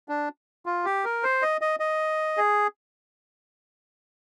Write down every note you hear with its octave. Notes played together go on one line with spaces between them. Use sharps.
D4
F4
G4
A#4
C5
D#5
D#5
D#5
G#4